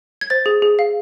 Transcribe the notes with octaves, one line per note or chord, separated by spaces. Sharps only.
G#6
C5 A6
G#4
G#4
F5